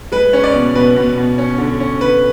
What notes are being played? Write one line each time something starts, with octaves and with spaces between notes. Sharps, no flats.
G#3 B4
C#4
D5
B2
B2 B4
B2
B2
C#4
D3
C#4
D3 B4